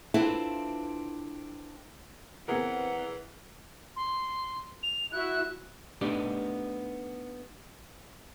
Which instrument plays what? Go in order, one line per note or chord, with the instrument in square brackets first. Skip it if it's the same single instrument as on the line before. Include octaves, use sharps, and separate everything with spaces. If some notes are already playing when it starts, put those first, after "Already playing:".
[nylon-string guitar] C4 D4 E4 F4 A4 B4
[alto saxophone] E3 [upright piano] B3 G#4 A#4 [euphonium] C4 [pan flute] F#5
[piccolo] C6
F7
[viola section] E4 F#4 E5 [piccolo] F#6
[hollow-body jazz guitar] A3 B3 D4 D#4 G4 D5